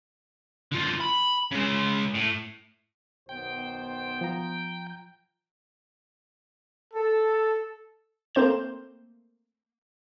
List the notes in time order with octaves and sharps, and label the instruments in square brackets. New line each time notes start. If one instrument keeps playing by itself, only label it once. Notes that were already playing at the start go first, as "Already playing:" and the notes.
[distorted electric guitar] D3 F4
B5
C#3 G#3
A2
[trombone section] B1 D#3 C5 [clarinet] B3 [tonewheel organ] G5
[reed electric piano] F3 A#5
[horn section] A4
[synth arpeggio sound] A3 A#3 C4 C5 G6 E7